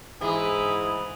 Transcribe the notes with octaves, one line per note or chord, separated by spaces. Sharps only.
G#2 E3 E4 G#4